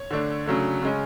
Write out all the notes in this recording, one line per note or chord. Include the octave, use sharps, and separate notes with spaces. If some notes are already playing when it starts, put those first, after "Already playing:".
Already playing: C#5
D3 A3 D4
C#3 F#3 A3 D4
C#3 G#3 C#4